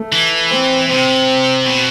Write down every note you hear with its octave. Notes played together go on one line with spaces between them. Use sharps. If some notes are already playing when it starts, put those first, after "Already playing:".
Already playing: A3
E3
C4
C3 C4
B2